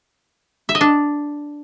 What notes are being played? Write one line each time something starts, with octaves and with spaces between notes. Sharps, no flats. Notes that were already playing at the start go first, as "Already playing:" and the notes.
E5
D#5
D4